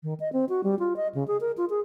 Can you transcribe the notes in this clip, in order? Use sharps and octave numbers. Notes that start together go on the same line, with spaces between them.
D#3
D#5
C4
F#4
G3
F4
D#5
C#3
G#4
A#4
F4
G#4